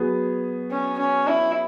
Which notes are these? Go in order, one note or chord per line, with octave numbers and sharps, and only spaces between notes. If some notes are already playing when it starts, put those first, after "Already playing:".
Already playing: F#3 B3 G#4
C#4
C#4
E4